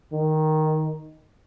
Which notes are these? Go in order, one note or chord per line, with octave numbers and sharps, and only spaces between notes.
D#3